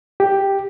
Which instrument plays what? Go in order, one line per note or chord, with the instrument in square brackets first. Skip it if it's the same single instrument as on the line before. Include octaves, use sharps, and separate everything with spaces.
[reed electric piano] G4